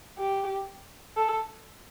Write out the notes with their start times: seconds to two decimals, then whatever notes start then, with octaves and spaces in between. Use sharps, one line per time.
0.18 G4
1.17 A4